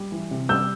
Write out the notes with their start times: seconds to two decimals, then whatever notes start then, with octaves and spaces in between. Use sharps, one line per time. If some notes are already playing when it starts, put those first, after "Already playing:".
Already playing: G3
0.12 E3
0.31 C3
0.49 G3 E6 G6